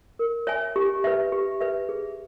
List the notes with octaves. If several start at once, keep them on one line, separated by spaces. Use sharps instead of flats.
A#4
C#5 E5 G#5
G4
B4 E5
G4
B4 E5
G#4